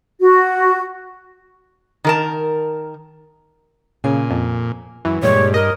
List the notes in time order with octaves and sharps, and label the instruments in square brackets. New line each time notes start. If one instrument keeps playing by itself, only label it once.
[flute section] F#4
[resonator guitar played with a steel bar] D#3 A#4 A5
[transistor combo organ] A#2 [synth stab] C#3 [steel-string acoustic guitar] G#5
[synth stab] F2
[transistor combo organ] F#2 [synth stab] E3
[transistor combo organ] G2 [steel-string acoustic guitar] A#2 G3 G#3 [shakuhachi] C#5
[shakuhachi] A#4 [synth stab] D#5